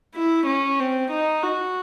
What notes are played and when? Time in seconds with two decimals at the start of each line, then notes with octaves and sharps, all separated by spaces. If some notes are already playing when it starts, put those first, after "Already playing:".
0.14 E4
0.46 C#4
0.80 C4
1.11 D#4
1.43 F#4